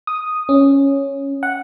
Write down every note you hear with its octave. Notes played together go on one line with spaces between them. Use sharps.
D#6
C#4
F#5